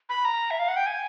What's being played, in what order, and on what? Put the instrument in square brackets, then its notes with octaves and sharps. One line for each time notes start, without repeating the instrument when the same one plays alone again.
[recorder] B5
A#5
E5
F5
F#5
G5
G#5